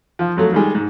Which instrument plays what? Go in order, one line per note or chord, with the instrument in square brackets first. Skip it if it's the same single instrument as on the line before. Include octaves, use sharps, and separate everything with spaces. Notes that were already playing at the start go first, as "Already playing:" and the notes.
[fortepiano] F3
F2 F#3 A3
D#3 G3 G#3
G#2